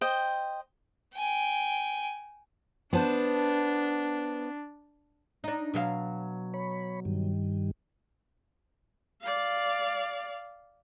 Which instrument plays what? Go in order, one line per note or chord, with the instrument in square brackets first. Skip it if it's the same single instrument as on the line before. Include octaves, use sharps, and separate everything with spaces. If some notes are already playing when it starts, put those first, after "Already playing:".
[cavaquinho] C5 D#5 G5
[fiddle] G5 G#5
[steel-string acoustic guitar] B3 C5 A5 [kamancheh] D4
[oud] D4 D#4
B2 F#3 F5
[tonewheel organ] C#5 B5
G2 D#3 G3
[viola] D5 F5